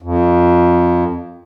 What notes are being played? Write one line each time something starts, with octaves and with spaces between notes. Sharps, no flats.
F2